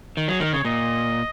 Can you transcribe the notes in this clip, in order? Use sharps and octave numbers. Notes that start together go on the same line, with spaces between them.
D#3
F#3 G#4
D#3 A#4
C#3 C#5
A#2 D#5